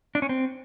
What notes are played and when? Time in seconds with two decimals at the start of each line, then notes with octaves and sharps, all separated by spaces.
0.15 D4
0.22 C#4
0.29 C4